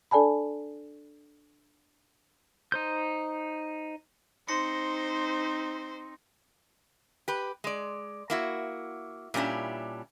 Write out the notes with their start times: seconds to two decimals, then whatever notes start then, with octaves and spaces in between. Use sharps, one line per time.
0.11 D4 A4 D5 G#5 A5 B5
2.72 D#4 C5 G6
4.48 C4 D#4 C5 C6 A#6 C#7
7.28 G4 B4
7.64 G#3 D5
8.30 A#3 E4 F#4
9.34 A#2 G3 C#4 D4 E4